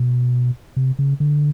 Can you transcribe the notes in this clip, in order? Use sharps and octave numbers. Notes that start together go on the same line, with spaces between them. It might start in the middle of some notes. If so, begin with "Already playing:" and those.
Already playing: B2
C3
C#3
D3